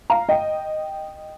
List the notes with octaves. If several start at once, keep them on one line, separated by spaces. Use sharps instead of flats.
F5 A#5
D#5 G5